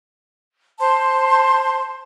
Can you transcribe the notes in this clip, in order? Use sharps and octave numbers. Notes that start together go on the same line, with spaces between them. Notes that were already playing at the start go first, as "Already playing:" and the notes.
C5 A5 C6